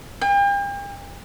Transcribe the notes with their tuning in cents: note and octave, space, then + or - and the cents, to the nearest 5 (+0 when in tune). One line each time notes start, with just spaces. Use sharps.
G5 +40